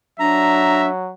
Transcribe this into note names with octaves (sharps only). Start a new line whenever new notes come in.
F#3 D4 E5 A#5